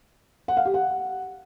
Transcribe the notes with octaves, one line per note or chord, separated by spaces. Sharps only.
F#5
F5
G4
F#5